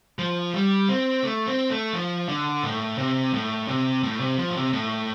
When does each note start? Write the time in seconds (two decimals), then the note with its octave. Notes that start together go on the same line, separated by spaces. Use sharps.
0.19 F3
0.54 G3
0.89 C4
1.24 A3
1.47 C4
1.70 A3
1.93 F3
2.28 D3
2.63 A2
2.98 C3
3.34 A2
3.68 C3
4.03 A2
4.20 C3
4.38 F3
4.50 A2
4.55 C3
4.73 A2